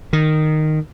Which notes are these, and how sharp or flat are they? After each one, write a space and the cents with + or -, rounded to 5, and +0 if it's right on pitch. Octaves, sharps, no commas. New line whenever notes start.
D#3 -10